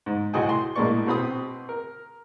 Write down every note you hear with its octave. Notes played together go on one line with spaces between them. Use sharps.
G#2
C2 A2 F#4 D#5 G5 G#5
C6
A#1 A2 G#3 A#3 D5 C#6
B2 C4 B5 D#6
A#4